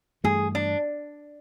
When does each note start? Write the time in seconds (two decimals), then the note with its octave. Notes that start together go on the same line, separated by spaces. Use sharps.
0.24 G2 E3 A3 G#4
0.55 D4